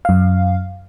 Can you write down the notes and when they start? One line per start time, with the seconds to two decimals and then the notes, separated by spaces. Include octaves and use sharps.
0.05 F#2 F5